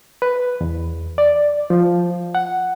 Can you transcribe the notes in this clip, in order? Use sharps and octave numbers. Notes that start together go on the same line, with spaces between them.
B4
E2
D5
F3
F#5